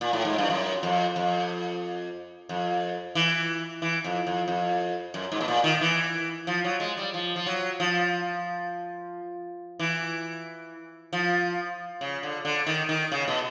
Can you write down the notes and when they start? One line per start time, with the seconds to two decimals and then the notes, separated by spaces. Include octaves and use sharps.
0.01 A#2
0.13 A2
0.25 G#2
0.38 G2
0.50 F#2
0.83 F2
1.16 F2
2.49 F2
3.15 E3
3.82 E3
4.04 F2
4.27 F2
4.48 F2
5.14 F#2
5.32 G#2
5.41 B2
5.48 A#2
5.64 D#3
5.81 E3
6.47 F3
6.64 F#3
6.80 G#3
6.97 G3
7.14 F3
7.36 F3
7.46 F#3
7.80 F3
9.79 E3
11.13 F3
12.01 C#3
12.23 D3
12.45 D3
12.66 D#3
12.89 D#3
13.12 C#3
13.28 B2